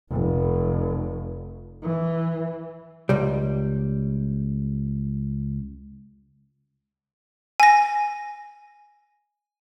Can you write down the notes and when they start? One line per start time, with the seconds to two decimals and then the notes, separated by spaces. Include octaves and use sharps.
0.10 F1
1.82 E3
3.09 C#2 G3
7.60 G#5 A#6